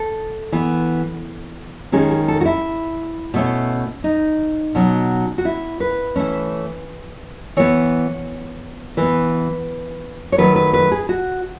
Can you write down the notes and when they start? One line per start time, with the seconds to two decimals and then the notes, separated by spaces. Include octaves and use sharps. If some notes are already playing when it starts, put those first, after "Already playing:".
Already playing: A4
0.52 E3 B3
1.92 D#3 G#3 C#4 G#4
2.11 G#4
2.28 A4
2.41 F#4
2.45 E4
3.34 B2 A3 C#4
4.04 D#4
4.75 B2 F#3 C#4
5.38 F#4
5.45 E4
5.80 B4
6.15 E3 A3 C#4
7.57 E3 B3 C#5
8.97 E3 B3 B4
10.32 C#5
10.38 D#3 F#3 A3 B4
10.56 B4
10.73 B4
10.91 G#4
11.09 F#4